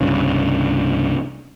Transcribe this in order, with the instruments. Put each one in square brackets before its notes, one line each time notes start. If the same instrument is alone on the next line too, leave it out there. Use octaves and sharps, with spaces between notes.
[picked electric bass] C2 G2 C#3